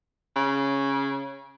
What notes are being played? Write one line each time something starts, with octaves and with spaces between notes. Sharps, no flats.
C#3